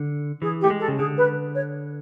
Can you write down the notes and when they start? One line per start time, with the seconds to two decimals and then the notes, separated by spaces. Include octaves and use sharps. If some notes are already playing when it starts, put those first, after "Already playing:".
Already playing: D3
0.42 E3 G#4
0.61 G4
0.64 A3
0.70 G#3
0.80 A4
0.88 C#3
0.98 D3 G#4
1.17 B4
1.55 C#5